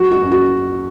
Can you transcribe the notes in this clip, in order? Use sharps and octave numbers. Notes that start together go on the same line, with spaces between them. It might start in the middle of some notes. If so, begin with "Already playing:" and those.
Already playing: F#3 F#4
F#4
F#2
F#4